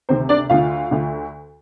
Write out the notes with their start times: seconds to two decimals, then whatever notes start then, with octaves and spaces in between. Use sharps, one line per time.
0.09 D2 C3 D#3 C4 C5
0.29 D4 D5
0.50 D2 D3 F4 F5
0.91 D2 D3